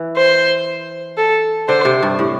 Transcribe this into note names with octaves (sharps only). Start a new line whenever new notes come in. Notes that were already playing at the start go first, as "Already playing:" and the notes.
Already playing: E3
C5
A4
D3 C5
C3
G2
A2